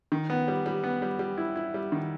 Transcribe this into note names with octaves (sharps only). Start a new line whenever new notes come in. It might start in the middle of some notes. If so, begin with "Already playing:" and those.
D#3
B3
G3
G3
B3
G3
G3
E4
E4
G3
D#3